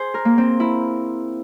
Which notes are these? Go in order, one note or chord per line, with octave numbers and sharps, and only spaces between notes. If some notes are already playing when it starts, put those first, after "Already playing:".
Already playing: G#4 C5
A#4
A#3
C4
E4